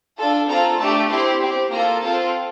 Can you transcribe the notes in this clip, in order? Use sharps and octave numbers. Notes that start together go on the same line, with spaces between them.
D4 F4 A4
C4 F4 A4 A#5
A3 D4 G4 A5
C4 E4 G4 C6
C4 G4
A#3 F4 A4 A#5
C4 F4 A4 A5